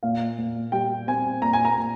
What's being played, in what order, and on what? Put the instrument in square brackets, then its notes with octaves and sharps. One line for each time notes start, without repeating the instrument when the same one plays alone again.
[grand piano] A#2 [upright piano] F5
[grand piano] A#2
[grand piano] G3 [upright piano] G5
[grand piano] C4 [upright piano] G#5
[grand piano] A#2 [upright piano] A#5
[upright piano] G#5
A#5
[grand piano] A#2